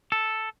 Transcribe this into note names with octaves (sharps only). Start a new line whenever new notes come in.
A4